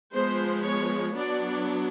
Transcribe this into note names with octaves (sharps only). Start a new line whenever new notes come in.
F3 G#3 B3 C5
C#5
F#3 B3 D4 D5